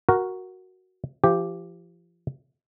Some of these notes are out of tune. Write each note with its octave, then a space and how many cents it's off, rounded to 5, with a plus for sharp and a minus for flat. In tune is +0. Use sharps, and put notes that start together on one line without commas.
F#4 +0 A#4 +0
F3 -35 G4 +0